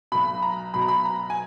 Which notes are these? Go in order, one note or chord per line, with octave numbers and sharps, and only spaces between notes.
B1 B2 B5
A#5
B1 B2 B5
A#5
B5
A#5
G#5